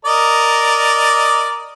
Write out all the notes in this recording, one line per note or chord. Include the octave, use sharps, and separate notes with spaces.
A#4 D5 D#5